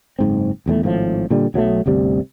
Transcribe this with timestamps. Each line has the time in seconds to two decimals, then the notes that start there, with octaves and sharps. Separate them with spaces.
0.19 F#1 G#2 C4
0.66 D#1 E2 G3 A3
0.83 G#1 A2 E3 F3
1.30 A#2 D3 G3
1.54 B1 F#3 G#3 A3
1.86 G1 D2 C3 G3